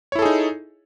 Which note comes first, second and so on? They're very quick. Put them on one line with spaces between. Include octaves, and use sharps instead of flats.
C#5 E4 A4 G#4 D#4